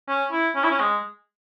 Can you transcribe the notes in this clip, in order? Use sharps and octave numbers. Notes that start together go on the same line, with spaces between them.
C#4
E4
C#4
E4
C#4
G#3